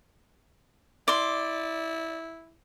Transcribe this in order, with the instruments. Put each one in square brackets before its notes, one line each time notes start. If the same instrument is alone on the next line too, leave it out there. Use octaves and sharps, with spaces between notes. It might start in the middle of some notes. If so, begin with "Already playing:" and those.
[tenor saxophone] E4 [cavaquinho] D5 C6